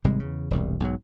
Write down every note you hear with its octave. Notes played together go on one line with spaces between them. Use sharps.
G#1 C3 G3 G#3
E2 C#3
E1 C2 G2
B1 G#2 F#3